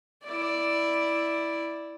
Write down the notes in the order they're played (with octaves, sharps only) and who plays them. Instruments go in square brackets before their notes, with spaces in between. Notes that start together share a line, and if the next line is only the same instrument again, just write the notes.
[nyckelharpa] E4 D5